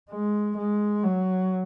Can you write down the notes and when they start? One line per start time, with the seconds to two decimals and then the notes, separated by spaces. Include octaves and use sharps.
0.11 G#3
0.57 G#3
1.04 F#3